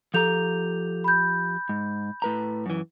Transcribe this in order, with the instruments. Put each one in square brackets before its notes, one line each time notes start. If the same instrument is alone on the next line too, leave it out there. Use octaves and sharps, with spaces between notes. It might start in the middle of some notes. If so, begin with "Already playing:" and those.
[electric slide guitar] F3 G4 A#5 [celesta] A4 G6 F7
[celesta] B5 G6
[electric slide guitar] G#2
A2 B4 A#5
F#2 E3